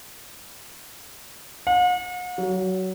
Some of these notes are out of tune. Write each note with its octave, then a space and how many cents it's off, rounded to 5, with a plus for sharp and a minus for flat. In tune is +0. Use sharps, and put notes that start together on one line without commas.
F#5 -45
F#3 +20